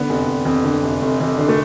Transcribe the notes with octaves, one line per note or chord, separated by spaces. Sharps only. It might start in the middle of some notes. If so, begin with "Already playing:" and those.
Already playing: D3 B3
F1
F1
F2
D3
F1
F1
F2
D3
A3